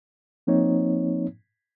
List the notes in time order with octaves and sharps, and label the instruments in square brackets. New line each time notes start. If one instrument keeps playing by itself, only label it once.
[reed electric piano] F3 A#3 C4 D#4 C#5